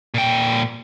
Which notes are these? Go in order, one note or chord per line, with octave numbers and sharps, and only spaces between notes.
A#2 G5